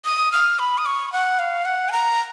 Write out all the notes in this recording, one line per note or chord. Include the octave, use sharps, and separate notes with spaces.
D#6
F6
B5
D#6
C#6
F#5
F5
F#5
G#5
A#5